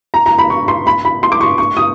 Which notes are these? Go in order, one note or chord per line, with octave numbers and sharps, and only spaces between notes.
A#5
A#5
B5
C#6
C6
B5
B5
C6
D6
C#6
C#6
D#6